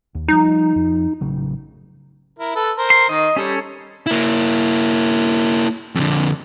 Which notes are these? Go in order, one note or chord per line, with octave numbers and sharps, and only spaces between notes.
D#2
F3 G3 D#4
F2 F3
A1 C#3 F#3
E4 A#4
A4 B4
A#4 C5
C6
D#3 D#5
G3 C#4 A4 C#5
A#3 E4
F2 D3